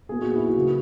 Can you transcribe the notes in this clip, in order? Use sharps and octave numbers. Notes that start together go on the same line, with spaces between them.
A#2 F#3 B3 G#4
F#4
E4
F#4
C#3 F#3 A#3